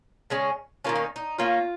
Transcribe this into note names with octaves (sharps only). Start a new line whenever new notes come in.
C#3 G#3 C#4
D#3 A#3 C#4 F4
D#4
D#4
D#3 A#3 C#4 F4